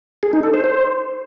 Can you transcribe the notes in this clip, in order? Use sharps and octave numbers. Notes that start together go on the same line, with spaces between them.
G#4
D#4
A4
C5
C5